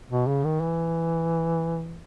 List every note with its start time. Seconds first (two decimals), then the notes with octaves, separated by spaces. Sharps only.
0.11 B2
0.27 C#3
0.44 D#3
0.61 E3